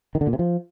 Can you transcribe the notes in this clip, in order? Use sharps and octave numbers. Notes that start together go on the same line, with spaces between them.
D#3
D3
A#2
C3
F3